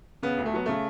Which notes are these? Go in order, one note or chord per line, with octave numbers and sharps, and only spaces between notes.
C#3 B3
D2
A3
F#3 B3
C#3 A3